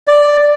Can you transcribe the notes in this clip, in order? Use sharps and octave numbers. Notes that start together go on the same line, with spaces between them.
D5